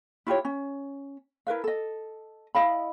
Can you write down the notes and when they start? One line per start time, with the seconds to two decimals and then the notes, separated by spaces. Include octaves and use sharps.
0.27 E4 F4 G4 C#5
0.45 C#4
1.47 E4 A#4 B4 F5
1.64 A4 D#5
2.55 E4 D#5 F5 B5